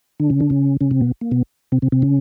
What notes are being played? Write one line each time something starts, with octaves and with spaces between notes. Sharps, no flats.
D3 D4
C#3 C#4
D3 D4
C#3 C#4
C#3 C#4
C3 C4
B2 B3
A#3
B2 B3
C3 C4
C3 C4
C3 C4
C#3 C#4